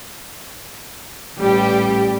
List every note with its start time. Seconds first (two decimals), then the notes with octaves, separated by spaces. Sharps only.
1.38 A1 G3 G4